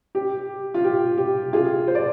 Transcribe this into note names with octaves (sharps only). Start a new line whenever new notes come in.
G4
F4
G4
G4
F4 G#4
C5
D5